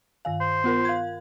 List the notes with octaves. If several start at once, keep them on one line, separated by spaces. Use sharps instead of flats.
G2 D#3 F5 G#5
C5
B3 F4 A#4
F5 G#6